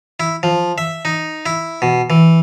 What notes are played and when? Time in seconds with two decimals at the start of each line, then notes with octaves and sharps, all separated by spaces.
0.20 E4
0.43 F3
0.78 E5
1.05 D#4
1.46 E4
1.82 B2
2.10 E3